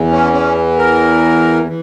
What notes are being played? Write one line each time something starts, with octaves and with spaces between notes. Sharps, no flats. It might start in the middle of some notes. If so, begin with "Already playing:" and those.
Already playing: E2 E3
C#4
C#4
A#4
E3